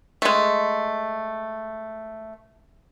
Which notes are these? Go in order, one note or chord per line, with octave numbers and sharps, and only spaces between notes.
G#3 A3